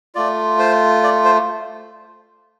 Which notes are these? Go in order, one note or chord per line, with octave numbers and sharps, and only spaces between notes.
A3 F4 D5
C5
D5
C5